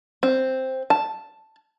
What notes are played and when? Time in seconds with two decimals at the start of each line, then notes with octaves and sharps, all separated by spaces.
0.23 C4
0.90 A5